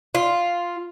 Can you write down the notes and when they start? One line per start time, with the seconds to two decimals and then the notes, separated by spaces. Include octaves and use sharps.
0.15 F4